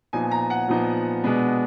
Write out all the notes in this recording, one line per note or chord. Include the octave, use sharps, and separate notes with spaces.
A#2 F3 B3 D#4 G#5
A#5
F#5
A#2 F3 B3 D#4
B2 G#3 B3 D4